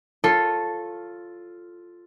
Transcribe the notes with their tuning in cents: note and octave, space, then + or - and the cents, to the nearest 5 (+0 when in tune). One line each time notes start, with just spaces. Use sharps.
F4 +0 A4 +0 C#5 -25